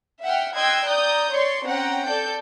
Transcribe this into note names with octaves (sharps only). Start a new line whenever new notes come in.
E5 F#5 G5 F6
D#5 G5 C6 E6 F#6 G#6
D5 A#5 D#6 G6
C#5 D5 C6 C#6
C4 C#4 F#5 G5 A#5
A4 D5 G6